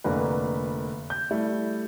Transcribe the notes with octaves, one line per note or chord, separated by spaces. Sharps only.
F1 D3 A#3 B4
G6
G3 A3 E4